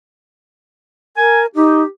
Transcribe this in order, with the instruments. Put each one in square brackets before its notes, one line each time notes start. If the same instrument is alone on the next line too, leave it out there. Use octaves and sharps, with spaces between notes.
[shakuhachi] A#4 [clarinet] G#5
[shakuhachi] D#4 [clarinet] G4